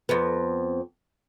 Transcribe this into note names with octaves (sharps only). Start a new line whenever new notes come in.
F2 B3